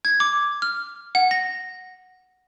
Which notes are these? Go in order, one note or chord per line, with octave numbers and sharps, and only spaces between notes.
G#6
D6
F6
F#5
A#6